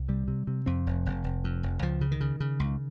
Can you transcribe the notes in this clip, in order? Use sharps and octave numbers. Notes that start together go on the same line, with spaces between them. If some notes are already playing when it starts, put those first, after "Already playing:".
Already playing: C2
C3 G3
C3
C3
F2 C4
F1
F1
F1
F2
F1
C#2 F3
C#3
D#3
C#3
C#3
C#2